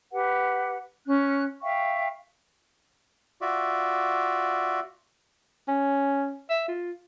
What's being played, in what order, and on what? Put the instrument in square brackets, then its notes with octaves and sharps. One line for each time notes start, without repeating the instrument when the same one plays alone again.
[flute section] G4 B4 F#5
C#4 F#6
E5 F5 G5 C#6
[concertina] F4 F#4 D5 E5
[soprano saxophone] C#4
E5
F4